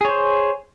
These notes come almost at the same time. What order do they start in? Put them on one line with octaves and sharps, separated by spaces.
G#4 C#5 C5